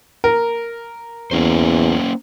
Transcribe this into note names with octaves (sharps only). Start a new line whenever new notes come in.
A#4
E2 A#3 C#4 C5